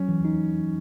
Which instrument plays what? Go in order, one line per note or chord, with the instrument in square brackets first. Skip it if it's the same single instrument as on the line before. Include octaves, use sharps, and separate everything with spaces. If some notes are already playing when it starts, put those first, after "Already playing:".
Already playing: [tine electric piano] F#3 [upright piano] C#4
[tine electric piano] E3
D#4